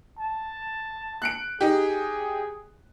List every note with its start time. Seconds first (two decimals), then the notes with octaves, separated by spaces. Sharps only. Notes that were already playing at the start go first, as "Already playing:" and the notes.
0.19 A5
1.22 F#6 C#7 D7
1.61 D#4 G4 G#4